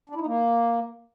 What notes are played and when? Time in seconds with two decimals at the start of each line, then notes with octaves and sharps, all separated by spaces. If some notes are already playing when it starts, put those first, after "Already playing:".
0.10 D4
0.15 E4
0.21 D#4
0.26 A#3